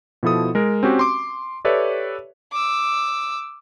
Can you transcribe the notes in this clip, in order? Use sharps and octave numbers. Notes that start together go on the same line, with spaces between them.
B2 F3 E4 A4 D#6
G#3 A#4
C4 C#4 F#4 G4
C6 D6
G4 A4 B4 C#5 D5 E5
D6 E6